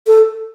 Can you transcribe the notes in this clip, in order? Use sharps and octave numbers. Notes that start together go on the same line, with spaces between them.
A4